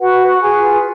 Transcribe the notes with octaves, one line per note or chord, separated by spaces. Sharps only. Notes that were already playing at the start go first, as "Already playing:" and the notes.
F#4 B4 F#5
B4
G#4 G#5
F4